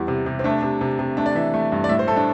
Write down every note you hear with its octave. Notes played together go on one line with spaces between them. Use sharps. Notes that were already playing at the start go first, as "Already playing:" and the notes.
Already playing: E2 G3 E4
C3
C3
C4
A3 D4
C3
C3
C3
A3 D4
D5
E3 E5
A3
G2
D5
A2 E5
C5
A3 A4
D4